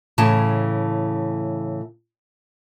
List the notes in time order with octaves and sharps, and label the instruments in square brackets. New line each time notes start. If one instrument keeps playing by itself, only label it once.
[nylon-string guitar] A2 C#3 E3 A5